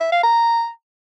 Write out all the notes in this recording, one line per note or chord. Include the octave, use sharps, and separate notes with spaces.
E5
F5
A#5